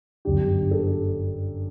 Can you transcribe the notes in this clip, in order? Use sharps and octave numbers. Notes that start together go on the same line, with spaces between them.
G1 F#2 D3 G4
A4